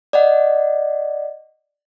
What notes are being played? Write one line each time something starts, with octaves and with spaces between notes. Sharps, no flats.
D5 D#5 F#5